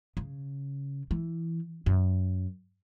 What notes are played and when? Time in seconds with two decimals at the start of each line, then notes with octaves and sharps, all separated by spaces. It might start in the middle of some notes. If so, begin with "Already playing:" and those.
0.17 C#3
1.11 E3
1.86 F#2